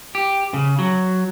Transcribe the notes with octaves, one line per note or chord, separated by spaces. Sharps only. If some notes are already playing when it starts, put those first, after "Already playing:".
G4
C#3
F#3